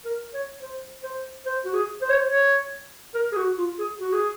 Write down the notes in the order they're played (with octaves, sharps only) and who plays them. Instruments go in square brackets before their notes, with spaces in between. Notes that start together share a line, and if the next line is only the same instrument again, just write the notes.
[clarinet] A#4
C#5
C5
C5
C5
F#4
G#4
C5
C#5
C5
C#5
A#4
G#4
F#4
F4
G#4
F#4
G#4